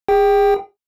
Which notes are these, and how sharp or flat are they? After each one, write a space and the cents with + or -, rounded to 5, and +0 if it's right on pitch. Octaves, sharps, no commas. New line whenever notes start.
G#4 -30 G5 -5